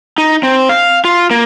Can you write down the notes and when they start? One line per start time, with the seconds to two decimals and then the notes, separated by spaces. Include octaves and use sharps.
0.18 D#4
0.43 C4
0.69 F5
1.05 F4
1.31 A#3